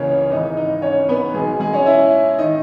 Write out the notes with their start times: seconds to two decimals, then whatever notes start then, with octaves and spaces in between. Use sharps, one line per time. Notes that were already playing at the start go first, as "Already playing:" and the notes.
Already playing: C#2 C#3 E3 A#3 C#4 C#5
0.30 G#1 G#2 E3 D#4 D#5
0.57 D#4 D#5
0.82 C#4 C#5
1.09 B3 B4
1.34 B1 B2 G#3 G#4
1.60 G#3 G#4
1.73 C#4 C#5
1.86 E4 E5
2.38 D#3 D#4 D#5